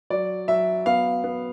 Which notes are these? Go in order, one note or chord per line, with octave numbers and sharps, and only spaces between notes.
F#3 D5
F#3 E5
B3 F5
B3